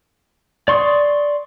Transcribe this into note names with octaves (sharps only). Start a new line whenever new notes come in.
D5 C6 C#6 D#6